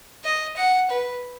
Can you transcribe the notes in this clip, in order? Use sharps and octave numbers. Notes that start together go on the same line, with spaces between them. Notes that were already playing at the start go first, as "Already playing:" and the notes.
D#5
F#5
B4